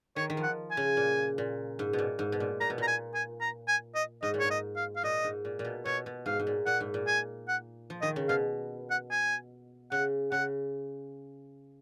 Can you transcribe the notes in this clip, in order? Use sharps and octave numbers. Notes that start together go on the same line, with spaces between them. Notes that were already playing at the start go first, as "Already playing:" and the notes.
D#3 C#5
D#3
F3
F#5
G#5
C#3
A#2
A#2
G#2
B2
A#2
G#2
B2
A#2
A#2 A#5
B2
A#2 A#5
G#5
G#5
A#5
G#5
D#5
G#2 D#5
A#2
G#2 C#5
D#5
F5
F5
A#2 D#5
G#2
A#2
A#2
B2
B2 C#5
B2
G#2 F5
G#2
A#2
A#2 F#5
G#2
A#2
G#5
F#5
F3
D#3 D#5
C#3
B2 F5
F#5
G#5
C#3 F#5
C#3 F#5